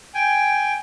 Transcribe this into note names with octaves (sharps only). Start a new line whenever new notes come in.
G5 G#5